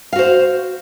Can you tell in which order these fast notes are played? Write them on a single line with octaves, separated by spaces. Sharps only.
F5 F#4 C5